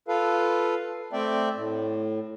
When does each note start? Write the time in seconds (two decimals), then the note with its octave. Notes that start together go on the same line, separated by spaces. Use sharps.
0.08 F4 A4 B4 F5
1.13 A3 C4 D5 E5 G5
1.56 A2